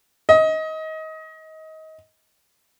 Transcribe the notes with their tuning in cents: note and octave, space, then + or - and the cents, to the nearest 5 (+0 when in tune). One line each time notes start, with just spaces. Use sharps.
D#5 +25